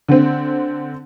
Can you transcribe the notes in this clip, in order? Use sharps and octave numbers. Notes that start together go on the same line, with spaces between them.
D3 C4